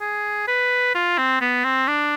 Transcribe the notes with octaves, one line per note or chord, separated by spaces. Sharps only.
G#4
B4
F4
C4
B3
C4
D4